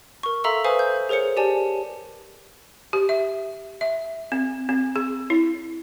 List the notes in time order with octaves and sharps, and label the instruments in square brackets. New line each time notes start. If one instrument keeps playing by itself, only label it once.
[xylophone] A#4 C#6
A4 E5 F5 A#5 C6 E6
B4 C5 F5 G#5 D#6
G6
G#4 A#4 C5 C#5 C#7
G4 D5 G#5 A5
[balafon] G4
E5
E5
C4
C4
G#4
E4